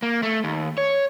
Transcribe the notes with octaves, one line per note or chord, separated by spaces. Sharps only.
A#3
A3
D#2
C#5